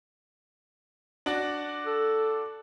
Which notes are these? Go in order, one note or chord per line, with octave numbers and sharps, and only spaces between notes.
D4 F#4 D5
A4